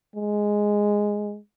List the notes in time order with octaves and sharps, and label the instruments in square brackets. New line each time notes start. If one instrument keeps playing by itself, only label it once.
[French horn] G#3